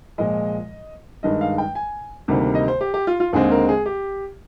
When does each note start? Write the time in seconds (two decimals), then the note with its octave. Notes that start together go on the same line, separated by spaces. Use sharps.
0.18 A#2 F3 G#3 D#5
1.23 G2 D#3 G#3 D#5
1.41 F5
1.58 G5
1.75 G#5
2.28 D2 C3 D#3 G3 A#3
2.55 D#5
2.68 C5
2.81 G4
2.94 G4
3.07 F4
3.20 F4
3.33 D#2 D3 G#3 C4 G#4
3.52 A#4
3.69 G#4
3.86 G4